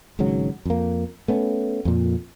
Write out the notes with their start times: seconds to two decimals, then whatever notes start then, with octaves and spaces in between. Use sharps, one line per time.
0.19 G#1 G#2 C#3 F#3
0.65 F2 A#3
1.28 A3 B3 C#4
1.85 F2 A#2